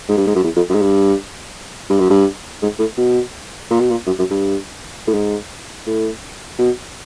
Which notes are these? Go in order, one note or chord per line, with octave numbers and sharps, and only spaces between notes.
G#2
G2
G#2
F#2
E2
F2
F#2
G#2
G2
G2
F#2
G2
G#2
A2
B2
A#2
B2
A#2
F#2
F#2
G2
A2
G#2
A2
B2